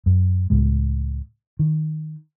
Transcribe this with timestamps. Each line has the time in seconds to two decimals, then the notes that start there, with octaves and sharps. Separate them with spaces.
0.06 F#2
0.50 C#2 A2 G#3
1.59 D#3